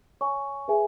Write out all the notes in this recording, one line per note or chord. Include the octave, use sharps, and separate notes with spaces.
C#5 G#5 C#6
G#4 B4 E5 G#5